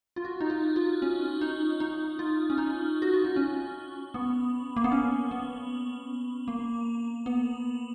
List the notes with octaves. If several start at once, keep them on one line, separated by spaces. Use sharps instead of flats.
F4
F#4
D#4
F4
F4
C#4
D#4
D#4
F4
C#4
D#4
F#4
F4
D#4
C#4
B3
A#3
B3
C#4
B3
A#3
B3